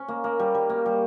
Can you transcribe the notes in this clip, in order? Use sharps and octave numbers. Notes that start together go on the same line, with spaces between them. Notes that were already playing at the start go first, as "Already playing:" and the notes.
Already playing: C#4
A#3
A#3
G3
G3
A#3
G3